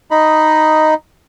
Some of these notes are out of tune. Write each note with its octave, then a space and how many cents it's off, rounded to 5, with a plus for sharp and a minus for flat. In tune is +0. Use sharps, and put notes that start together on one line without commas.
D#4 +0 D#5 +0 B5 +0